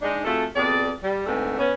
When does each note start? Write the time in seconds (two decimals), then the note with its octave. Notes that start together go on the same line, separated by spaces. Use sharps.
0.02 G#2 G#3 D4 D#4
0.25 F2 A3 F4 F#4 G#4 A4
0.56 F2 B2 G#4 D5
1.03 G3
1.26 D2 G#2 D3 A3 B3 C4
1.59 B3 C#4